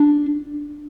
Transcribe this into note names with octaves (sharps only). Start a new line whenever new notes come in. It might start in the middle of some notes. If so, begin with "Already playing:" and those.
Already playing: D4